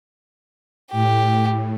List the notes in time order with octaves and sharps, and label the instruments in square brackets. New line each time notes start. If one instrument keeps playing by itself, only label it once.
[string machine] A2 [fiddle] G4